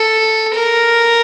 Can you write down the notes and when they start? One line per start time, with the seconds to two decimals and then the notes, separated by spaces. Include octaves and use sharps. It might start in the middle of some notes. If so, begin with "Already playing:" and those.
Already playing: A4
0.55 A#4